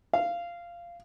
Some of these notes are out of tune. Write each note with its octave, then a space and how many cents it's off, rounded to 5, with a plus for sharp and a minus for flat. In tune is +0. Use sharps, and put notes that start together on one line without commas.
F5 -15